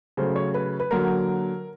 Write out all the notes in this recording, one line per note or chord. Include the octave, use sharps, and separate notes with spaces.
C#3 F#3 A3 C5
C#5
B4
B4
D3 F#3 A#3 A#4